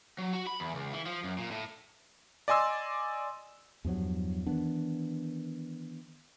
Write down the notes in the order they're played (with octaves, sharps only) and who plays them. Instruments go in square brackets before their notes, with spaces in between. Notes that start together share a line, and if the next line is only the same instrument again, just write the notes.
[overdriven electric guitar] F#3
F#4
B5
E2
C#2
E3
F3
F#2
A#2
A2
[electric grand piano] D5 D#5 G#5 C6 E6
[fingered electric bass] E2 G2 F3 F#3
D#3 E3 B3 D4